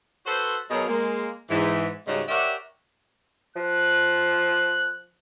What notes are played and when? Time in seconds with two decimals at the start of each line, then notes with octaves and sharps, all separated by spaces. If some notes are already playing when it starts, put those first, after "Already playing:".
0.26 F#4 A4 B4 C5
0.71 B2 F#3 G#4 A#4 D#5 F5
0.87 G#3 A#3
1.50 G#2 E3
2.07 G#2 C#3 G3 G#3 D#4 F#4
2.28 G4 A#4 C#5 D5 E5 F#5
3.56 F3 F#6